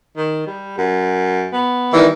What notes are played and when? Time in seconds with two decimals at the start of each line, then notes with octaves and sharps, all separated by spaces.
0.17 D#3
0.47 G3
0.78 F#2
1.53 B3
1.93 D#3 E3 G3